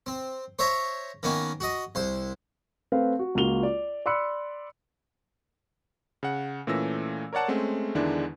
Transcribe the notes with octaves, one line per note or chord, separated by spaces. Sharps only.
C4
C5 C#5 E5 A#5
D#3 A#3 B3 C#4
F#4 D#5
C2 C5
A3 C4 B4 F5
F#4
C#2 A#3 F4 F#4 F7 G7
D5
D5 B5 C6 E6 F#6 C#7
C#3 F#5
A#2 E3 A3 C#4 E6 A#6
A#4 C#5 D5 F#5 A5
G#3 A3 C4 C#4
E2 D3 D#3 G#3 D4 E4